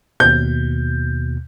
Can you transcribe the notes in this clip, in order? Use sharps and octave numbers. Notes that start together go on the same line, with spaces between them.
D#2 B2 G6